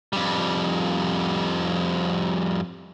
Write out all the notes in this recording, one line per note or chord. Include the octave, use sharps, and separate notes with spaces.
F2 G3